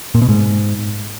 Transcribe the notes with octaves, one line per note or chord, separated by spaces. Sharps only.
A#2
B2
G#2